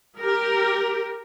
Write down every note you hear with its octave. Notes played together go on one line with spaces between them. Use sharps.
G4 A#4